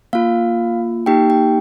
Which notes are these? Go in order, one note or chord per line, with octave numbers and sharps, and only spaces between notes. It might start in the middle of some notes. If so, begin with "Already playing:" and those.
A#3 F4 F5
A#3 D#4 G4 G5
G5